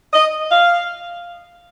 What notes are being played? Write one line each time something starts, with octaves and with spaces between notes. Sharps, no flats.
D#5
F5